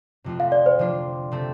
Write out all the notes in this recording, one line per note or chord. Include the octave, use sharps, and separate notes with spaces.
F2 C3 A3 F4
F5
D5
C5
C3 F3 D4 F4
C3 A3 C4 A4